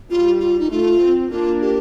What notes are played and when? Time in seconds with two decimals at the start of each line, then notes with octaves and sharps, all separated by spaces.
0.10 G3 F4
0.40 F4
0.60 D#4
0.70 A3 F4
1.00 C4
1.31 A#3 D4 F4
1.61 G4